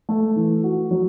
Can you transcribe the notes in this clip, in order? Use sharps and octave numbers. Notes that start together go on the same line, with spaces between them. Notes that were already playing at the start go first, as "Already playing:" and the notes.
A3
E3
F#4
F#3